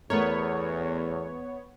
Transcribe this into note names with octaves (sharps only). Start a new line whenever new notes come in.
E2 A3 B3 A#4 C#5